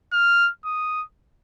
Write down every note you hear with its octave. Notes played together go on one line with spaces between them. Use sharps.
F6
D#6